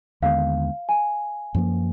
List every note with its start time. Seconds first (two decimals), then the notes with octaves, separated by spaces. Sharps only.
0.22 D#2 D3 G#3 B3 F5
0.89 G#5
1.55 F#2 F3 A#3